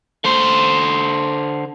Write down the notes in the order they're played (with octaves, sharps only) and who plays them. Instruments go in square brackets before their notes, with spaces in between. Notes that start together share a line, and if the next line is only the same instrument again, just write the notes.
[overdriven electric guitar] D3 C5